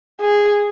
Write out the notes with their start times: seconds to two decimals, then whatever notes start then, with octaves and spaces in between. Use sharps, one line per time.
0.21 G#4